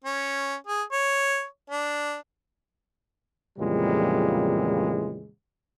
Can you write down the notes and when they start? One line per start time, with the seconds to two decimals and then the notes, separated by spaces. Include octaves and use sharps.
0.04 C#4
0.67 G#4
0.92 C#5
1.70 D4
3.58 F2 A#2 C#3 E3 G3 G#3